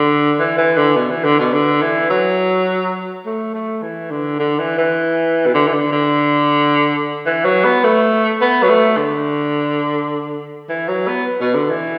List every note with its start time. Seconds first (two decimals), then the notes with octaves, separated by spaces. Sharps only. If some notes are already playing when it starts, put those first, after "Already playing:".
Already playing: D3
0.39 E3
0.58 E3
0.78 D3
0.96 B2
1.10 E3
1.25 D3
1.40 B2
1.54 D3
1.82 E3
2.10 F#3
3.25 A3
3.55 A3
3.83 E3
4.11 D3
4.40 D3
4.59 E3
4.78 E3
5.46 B2
5.54 D3
5.68 E3
5.74 D3
5.92 D3
7.26 E3
7.45 F#3
7.65 B3
7.84 A3
8.41 B3
8.63 F#3
8.69 A3
8.97 D3
10.69 E3
10.88 F#3
11.08 B3
11.41 B2
11.55 D3
11.70 E3